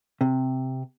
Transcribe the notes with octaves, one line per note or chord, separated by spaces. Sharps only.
C3